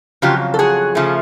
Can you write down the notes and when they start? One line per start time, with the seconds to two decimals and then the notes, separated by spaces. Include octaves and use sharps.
0.22 F2 C#3 F#3 F4 G4
0.54 A4
0.59 F#4 G#4
0.95 C#3 F3 A3